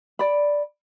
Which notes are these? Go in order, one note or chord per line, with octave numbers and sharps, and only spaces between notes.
D5 B5